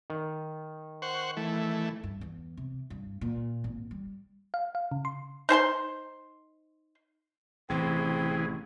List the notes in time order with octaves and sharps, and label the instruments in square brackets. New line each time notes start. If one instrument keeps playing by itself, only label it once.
[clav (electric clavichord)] D#3
[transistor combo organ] C5 F#5 C#6
E3 A3
[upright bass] G2
E2
C3
G2
A#2
G#1
G3
[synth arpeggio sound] F5
F5
C#3
C6
[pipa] D#4 C5 G#5 C6
[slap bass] A1 C3 [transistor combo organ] E3 G#4 [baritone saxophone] C4